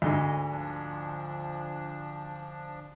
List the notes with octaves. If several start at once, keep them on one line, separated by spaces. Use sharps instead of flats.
D2 G#2 D3 D#5 C6
F3 D4